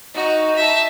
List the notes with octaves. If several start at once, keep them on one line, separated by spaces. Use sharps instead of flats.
D#4 F#4
E5 A5